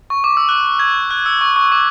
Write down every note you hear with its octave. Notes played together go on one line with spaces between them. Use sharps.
C#6
D6
E6
F#6
G#6
F#6
E6
C#6
C#6
D6